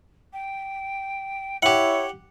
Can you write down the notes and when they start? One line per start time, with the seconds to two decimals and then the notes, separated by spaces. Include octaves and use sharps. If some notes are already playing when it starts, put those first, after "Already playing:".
0.33 G5
1.63 E4 G4 C#5 F#5